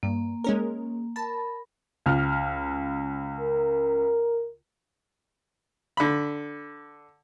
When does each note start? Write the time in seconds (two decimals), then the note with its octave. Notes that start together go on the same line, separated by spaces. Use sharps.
0.03 G2 A#3
0.44 G#3 C#4 A#4
1.16 A#4 A5 B5
2.06 C#2 F6
3.40 A#4
5.97 D3 B5